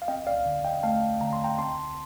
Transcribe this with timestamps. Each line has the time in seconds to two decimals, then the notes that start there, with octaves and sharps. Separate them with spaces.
0.02 F5
0.08 C4 D#5 G5
0.27 D5 F5
0.46 D3
0.65 D#5 G5
0.83 A3 F5 A5
1.21 D3 A#5
1.33 C6
1.44 G5 A#5
1.58 C4 A5 C6